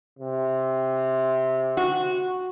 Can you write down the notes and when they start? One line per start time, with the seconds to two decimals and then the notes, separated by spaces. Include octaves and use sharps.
0.19 C3
1.77 F#4